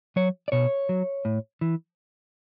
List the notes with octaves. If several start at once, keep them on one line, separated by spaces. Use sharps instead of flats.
F#3 C#5
D5
B2 C#5
F#3
A2
E3